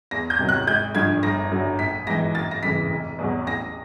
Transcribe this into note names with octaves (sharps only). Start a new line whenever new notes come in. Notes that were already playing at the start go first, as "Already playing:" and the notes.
E2 A#6
G6
C3 D#3 F#3
F#6
G#1 G6
G2 D3 F3 G#6
G1 A#6
F#2 D3 F#3
A#1 B6
G#2 E3 A#6
F#1 A6
A#6
F2 C#3 E3 B6
F1
E2 B2 F#3
A1 A#6